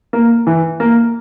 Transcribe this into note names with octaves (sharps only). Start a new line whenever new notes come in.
A#3
E3
A#3